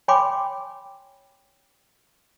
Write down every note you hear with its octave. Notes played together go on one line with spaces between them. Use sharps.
C#5 G5 G#5 B5 C6 D6